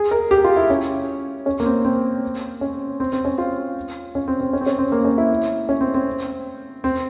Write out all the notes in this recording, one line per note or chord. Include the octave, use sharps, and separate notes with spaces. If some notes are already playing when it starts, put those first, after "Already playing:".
Already playing: G#4
A#4
G4
F4
E4
C#4
C#4
A#3
C4
C4
C#4
C4
C4
C#4
F4
C#4
C4
C4
C#4
C4
C#4
C4
A#3
C#4
E4
C#4
C4
C4
C4